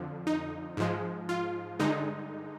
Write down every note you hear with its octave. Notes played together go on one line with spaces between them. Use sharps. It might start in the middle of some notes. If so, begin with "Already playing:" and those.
Already playing: F2 D3 F3
D#4
G#2 F3 G#3
F4
G2 D3 G#3 D#4